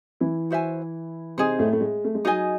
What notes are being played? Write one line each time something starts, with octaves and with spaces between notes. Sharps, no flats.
E3 E4
F#4 C5 E5 G#5
C3 C4 D#4 G#4 C5
A2 A3
A3
G#3
A3
G#3
F#3 D#4 G#4 D#5 G#5